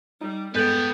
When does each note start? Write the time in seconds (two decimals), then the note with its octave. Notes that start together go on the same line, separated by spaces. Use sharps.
0.21 G3 D#4
0.55 G2 G#3 B3 A4 B4 G5 G6 A6